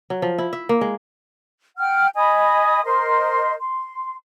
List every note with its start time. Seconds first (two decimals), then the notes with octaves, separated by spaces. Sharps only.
0.10 F#3
0.22 F3
0.38 E4
0.53 E5
0.69 A#3
0.81 G#3
1.78 F#5 G5 F6
2.15 D#5 G#5 B5 D#6
2.84 A#4 C5 D#5 C6
3.59 C6